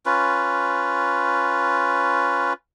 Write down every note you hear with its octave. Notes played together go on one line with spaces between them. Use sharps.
C#4 F4 B4